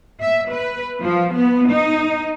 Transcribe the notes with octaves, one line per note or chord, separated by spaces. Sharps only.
E5
B4
F3
B3
D#4